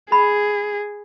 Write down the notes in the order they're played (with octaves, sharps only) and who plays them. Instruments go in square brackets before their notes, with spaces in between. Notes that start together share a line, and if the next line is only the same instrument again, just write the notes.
[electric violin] G#4 [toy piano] B5